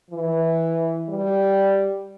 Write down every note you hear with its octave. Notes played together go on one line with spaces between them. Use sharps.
E3
G3